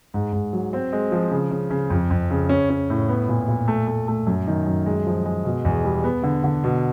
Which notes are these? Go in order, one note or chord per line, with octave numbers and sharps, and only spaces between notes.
G#2
G#2
F#3
C4
G#3
F3
C#3
C#3
C#3
F2
F2
C#3
C#4
C#4
A2
B3
A#2
A#2
A3
A3
A3
F#2
D#3
F#2
G#3
F3
G#3
B2
E2
G3
B3
D3
D3
B2